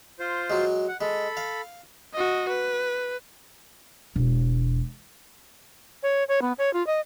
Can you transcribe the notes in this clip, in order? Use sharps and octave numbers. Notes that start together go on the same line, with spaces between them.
F4 C5
F#3 G#3
F#5
G#3 A4 B5
F5
F#4 D#5
B4
E1
C#5
C#5
B3
C#5
F4
D#5